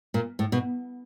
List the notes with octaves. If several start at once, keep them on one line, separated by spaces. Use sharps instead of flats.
A#2
A2
B2